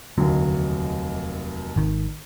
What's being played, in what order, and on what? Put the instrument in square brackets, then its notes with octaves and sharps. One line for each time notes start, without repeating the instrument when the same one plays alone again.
[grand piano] F1 D#2 F#3 [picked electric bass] D3
[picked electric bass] G#1 D#3